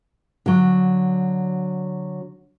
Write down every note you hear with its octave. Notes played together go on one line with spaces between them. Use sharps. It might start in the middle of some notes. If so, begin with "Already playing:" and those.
D3 F#3